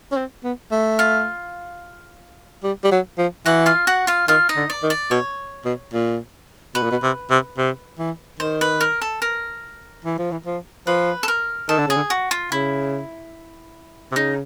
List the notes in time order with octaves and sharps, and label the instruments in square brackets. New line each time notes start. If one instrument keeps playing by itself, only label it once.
[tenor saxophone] C#4
C4
B3
A3
[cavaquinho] F4 F5
[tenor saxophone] G3
G3
F#3
F3
[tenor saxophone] E3 [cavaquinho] F#4 F#5
[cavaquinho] F4 F5
F#4 F#5
F4 F5
[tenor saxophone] D#3 [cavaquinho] F4 F5
[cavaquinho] D#4 D#5
[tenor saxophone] D3
[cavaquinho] D5
[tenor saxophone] D#3
[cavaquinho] D5
[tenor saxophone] B2 [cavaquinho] C#5
[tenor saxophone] B2
A#2
[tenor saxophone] B2 [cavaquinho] B4
[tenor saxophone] A#2
B2
C3
C3
C3
E3
[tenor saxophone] D#3 [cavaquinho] C5
[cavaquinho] B4
A#4
A4
A#4
[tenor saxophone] E3
F3
E3
F3
[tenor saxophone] F3 [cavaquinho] B4
[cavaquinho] A4
A#4
[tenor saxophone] D#3 [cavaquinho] A4
[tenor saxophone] D3
[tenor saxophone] C#3 [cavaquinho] G#4
[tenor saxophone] D3
[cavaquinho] F#4
F4
[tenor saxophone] C#3 [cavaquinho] E4
[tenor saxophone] C3
[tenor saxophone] C#3 [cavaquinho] D#4